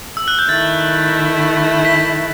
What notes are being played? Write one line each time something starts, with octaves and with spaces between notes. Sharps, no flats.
E6
F#6
G6
D#3 A3 E4 A6
B6